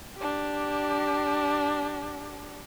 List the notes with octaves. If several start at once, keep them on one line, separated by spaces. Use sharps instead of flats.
D4 G4